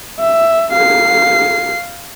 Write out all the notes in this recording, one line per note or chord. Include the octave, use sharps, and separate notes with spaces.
E5
F5 C7